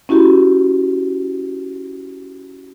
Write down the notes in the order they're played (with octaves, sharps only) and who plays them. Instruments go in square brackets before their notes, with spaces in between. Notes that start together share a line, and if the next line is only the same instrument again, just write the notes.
[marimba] C#4 E4 F#4 G4